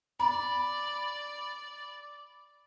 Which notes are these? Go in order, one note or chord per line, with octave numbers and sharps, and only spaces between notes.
D5 B5